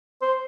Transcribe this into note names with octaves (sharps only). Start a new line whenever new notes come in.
C5